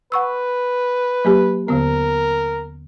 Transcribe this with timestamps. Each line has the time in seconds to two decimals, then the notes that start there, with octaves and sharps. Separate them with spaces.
0.12 B4 F#5 C#6 E6
1.25 F#3 A#3 G4
1.68 D#2 D3 B3 A#4